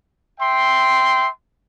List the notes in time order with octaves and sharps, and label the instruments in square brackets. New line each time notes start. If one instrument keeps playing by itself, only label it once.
[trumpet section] E5 G5 C6